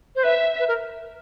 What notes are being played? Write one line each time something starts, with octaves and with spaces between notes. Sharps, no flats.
C5
B4 E5
B4
A#4